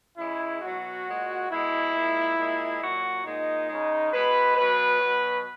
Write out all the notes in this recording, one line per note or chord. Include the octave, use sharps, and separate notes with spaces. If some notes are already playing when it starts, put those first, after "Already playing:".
C#3 G#3 E4
B2 F#3 F#4
A#2 G#3
B2 G#3 E4
A#2 G#3
A#2 G#3
A#2 F#3 F#4
A#2 G#3 D#4
C#3 G#3
B2 G#3 B4
B2 F#3 B4
B2 F#3